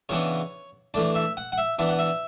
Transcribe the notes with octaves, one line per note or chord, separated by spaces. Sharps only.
C#3 E3 B3 D4 C#5
E3 A3 D4 D5
E5
F#5
F#5
E5
E3 B3 D4 E5
F#5
E5